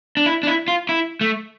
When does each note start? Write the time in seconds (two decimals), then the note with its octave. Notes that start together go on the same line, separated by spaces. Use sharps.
0.17 D4
0.26 E4
0.43 D4
0.47 E4
0.68 F4
0.89 E4
1.21 A3